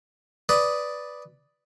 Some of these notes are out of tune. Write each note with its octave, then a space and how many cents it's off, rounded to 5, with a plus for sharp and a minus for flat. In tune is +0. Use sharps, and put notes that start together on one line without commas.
B4 +0 D5 +0 D#6 +0